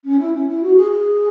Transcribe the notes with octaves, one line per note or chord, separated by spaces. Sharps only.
C#4
E4
C#4
E4
F#4
G#4
G#4